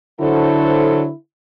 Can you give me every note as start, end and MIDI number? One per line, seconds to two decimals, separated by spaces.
0.21 1.11 50
0.21 1.04 54
0.21 1.16 64
0.21 1.04 69
0.21 1.04 72